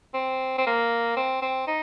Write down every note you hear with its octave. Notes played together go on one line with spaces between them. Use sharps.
C4
C4
A#3
C4
C4
D#4